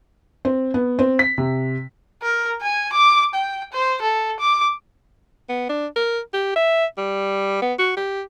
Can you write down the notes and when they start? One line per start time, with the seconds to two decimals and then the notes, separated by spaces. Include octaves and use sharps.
0.45 C4
0.74 B3
0.99 C4
1.19 B6
1.38 C3
2.22 A#4
2.61 G#5
2.92 D6
3.34 G5
3.73 C5
4.02 A4
4.40 D6
5.49 B3
5.69 D4
5.96 A#4
6.33 G4
6.56 E5
6.98 G3
7.62 B3
7.79 F#4
7.97 G4